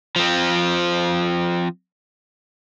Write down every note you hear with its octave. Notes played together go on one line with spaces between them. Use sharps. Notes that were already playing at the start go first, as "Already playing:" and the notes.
F3 C4